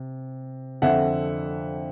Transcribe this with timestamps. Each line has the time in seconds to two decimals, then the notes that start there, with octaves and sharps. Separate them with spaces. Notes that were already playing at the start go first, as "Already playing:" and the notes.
Already playing: C3
0.82 F2 D3 E5 F#5